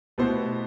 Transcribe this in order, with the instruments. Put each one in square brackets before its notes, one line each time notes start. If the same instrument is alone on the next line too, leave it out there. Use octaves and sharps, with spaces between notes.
[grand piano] B2 A3 E4 G4 C5 [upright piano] B3